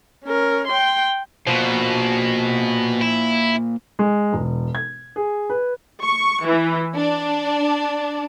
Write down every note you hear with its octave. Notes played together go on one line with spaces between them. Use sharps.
C#4 A#4
G5 C6
B2 A#3 F4 C5
E4
G#3
E1
G#6
G#4
B4
C#6
E3
D4